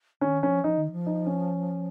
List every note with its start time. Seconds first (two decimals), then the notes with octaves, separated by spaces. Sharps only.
0.21 D#3 C#4
0.43 F3 C#4
0.64 F3 D#4
0.77 D#3
0.92 F3
1.06 D#4
1.27 C#4